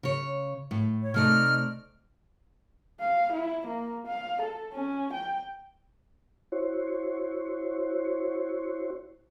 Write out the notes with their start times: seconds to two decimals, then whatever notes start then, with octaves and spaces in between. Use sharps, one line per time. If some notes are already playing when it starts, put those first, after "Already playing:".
0.03 C#3 C#5
0.71 A2
1.01 C#5
1.14 C3 A3 D#4 D5 F6
3.00 F5
3.33 E4
3.67 A#3
4.07 F5
4.42 A4
4.73 C#4
5.14 G5
6.52 E4 F#4 C5 C#5